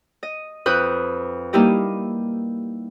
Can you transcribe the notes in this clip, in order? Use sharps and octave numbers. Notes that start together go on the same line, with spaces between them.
D#5
F2 B4 D#6 F#6 G6
G3 A#3 D#4 E4 G4 D#5